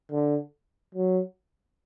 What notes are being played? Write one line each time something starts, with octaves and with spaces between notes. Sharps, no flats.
D3
F#3